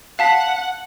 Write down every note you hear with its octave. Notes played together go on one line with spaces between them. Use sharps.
F5 F#5 A5 B6